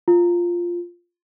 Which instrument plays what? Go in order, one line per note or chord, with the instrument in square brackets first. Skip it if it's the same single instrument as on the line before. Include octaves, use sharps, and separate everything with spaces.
[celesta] F4